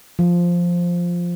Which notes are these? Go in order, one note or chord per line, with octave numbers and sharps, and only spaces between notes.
F3